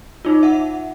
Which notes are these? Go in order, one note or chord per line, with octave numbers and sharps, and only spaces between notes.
D#4 F4
E5 F#5